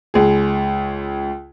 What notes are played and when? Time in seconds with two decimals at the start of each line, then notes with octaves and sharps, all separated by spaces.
0.14 C#2 G#4